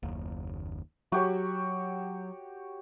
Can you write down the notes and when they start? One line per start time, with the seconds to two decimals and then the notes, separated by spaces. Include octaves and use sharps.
0.03 F#1 D#2
1.12 F#3 F#4 G4 C#5